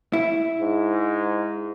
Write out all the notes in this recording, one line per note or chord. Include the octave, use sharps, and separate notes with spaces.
E4
G#2